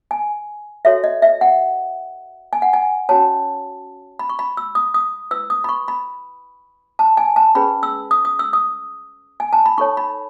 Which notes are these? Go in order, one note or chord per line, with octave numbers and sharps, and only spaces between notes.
G#5
F#4 A4 C#5 E5
D#5
E5
F#5
G#5
F#5
G#5
C#4 F#4 C#5 A5
B5
C#6
B5
E6
D#6
D#6
E4 B4 E6
D#6
B5
C#6
B5
A5
G#5
A5
C#4 G#4 B4 B5
E6
D#6
D#6
E6
D#6
G#5
A5
B5
D#4 A4 C#5 C#6
B5